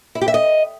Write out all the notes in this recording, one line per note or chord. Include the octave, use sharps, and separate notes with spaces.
E4
G4
E5
D#5